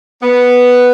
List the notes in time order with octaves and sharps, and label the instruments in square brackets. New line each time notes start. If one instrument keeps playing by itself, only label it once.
[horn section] B3